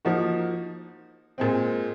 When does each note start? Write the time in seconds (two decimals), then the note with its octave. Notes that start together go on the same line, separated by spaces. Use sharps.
0.05 F3 A#3 D#4 F#4
1.38 A#2 G#3 C4